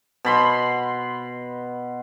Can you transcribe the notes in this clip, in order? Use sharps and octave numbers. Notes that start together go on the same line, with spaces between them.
B2 B5 C6